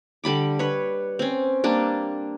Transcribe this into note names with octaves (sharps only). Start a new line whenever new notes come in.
D3 G3 B5 D6
B4 C#5
C4 C#4
G3 A#3 D4